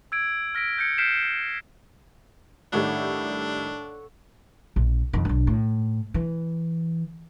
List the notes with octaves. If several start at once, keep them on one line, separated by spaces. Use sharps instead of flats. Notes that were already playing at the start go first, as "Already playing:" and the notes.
E6 G#6 D7
F6 A#6 B6 D7
G6 G#6 C#7
F6 G6 B6 C7 D7 E7
A2 D#3 G3 D4 A4 C#5 F#5
A#1
F2 D#3
B1 D4
A2
E3